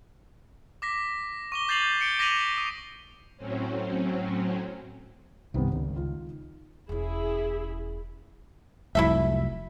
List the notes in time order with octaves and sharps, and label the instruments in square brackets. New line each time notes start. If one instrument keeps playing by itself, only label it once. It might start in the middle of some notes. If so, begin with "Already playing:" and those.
[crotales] D6 A#6 B6
C#6 D6 G7
D6 G6 A6 C7 F7 F#7
G6 C#7 D7 G7
D6 A#6 B6 D#7 F7 F#7
D#6
[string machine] A2 F#3 C4 C#4
[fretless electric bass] C2 G2 [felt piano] C3 D#3 B3
[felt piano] G#1 [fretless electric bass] C#2
[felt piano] D#3 F4
[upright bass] E1 C#4 [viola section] E4 G#4
[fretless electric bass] F1 C2 F#3 [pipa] E4 A4 E5